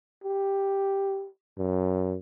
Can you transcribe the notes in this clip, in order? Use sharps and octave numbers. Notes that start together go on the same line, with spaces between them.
G4
F#2